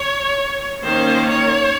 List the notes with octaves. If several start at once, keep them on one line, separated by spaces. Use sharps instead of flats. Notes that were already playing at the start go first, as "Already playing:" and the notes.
Already playing: C#5
D#3 A#3 C#4 C5
C#5